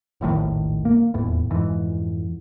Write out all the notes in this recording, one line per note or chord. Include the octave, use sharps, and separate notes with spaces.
F1 A#1 A2 D#3
A#3
D#1 E2 A2
F2 G#2 E3